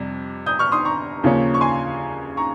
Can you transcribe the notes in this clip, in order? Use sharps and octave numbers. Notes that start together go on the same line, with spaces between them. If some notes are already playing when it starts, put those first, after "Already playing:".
Already playing: F2 C3 G3
D#6 G6
C#6 F6
C6 D#6
A#5 C#6
D#2 C#3 F3 A#3 C#4
C#6
G#5 C6
A#5 C#6